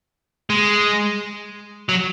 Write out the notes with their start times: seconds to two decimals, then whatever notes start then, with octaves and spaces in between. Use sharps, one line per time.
0.50 G#3
1.89 F#3